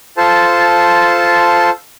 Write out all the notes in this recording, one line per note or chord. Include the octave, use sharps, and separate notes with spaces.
F4 A4 C5 A5